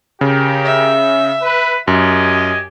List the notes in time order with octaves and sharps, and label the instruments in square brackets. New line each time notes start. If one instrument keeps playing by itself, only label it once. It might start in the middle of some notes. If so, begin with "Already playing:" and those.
[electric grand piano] C#3 [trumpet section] G4 A#4
[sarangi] E5
[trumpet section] B4
[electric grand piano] F#2 [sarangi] G4 [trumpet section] D#5 G#5